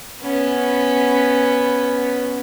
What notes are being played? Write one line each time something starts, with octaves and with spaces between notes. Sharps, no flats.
B3 C#4